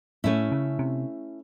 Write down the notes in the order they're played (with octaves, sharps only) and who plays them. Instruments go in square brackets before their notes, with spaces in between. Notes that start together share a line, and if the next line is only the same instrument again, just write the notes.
[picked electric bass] A2 [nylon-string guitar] A3 C#4 E4
[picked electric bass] C#3
C3